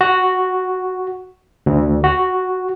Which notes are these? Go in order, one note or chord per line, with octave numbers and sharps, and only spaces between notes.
F#4
D2
F#4